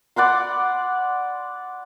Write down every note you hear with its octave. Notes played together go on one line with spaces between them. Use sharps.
D5 F#5 B5 C6